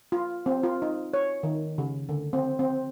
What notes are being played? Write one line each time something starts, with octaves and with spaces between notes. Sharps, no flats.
F4
C4
F4
D#4
C#5
D#3
C#3
D3
C4
C4